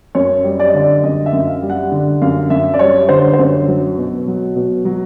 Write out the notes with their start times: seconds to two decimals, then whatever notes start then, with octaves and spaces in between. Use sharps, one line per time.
0.15 F#2 C#5
0.44 G3
0.60 D5
0.68 D#5
0.74 D3 D5
1.03 F#2 D#5
1.26 E5
1.33 F#2
1.47 F5
1.62 G3
1.70 F#5
1.92 D3
2.22 F#2 F5
2.50 F#2 E5
2.74 D5
2.79 G3 C#5
3.09 D3 C5
3.33 C5
3.38 F#2 C#5
3.68 F#3
3.98 B2
4.27 F#3
4.56 B2
4.85 F#3